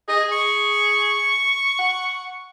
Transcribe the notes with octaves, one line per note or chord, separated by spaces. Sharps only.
G#4 D#5
C#6
F#5